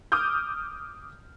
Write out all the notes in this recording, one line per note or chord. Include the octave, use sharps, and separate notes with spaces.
D6 D#6 F6 G6